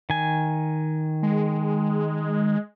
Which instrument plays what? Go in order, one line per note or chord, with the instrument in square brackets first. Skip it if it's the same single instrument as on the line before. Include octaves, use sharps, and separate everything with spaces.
[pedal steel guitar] D#3 G#5
[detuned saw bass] G#3